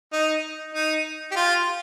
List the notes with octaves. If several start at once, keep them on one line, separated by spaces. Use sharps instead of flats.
D#4
D#4
G4
F4